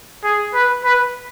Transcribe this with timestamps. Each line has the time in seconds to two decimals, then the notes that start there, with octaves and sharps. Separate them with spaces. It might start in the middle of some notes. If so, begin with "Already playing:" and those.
0.24 G#4
0.54 B4
0.84 B4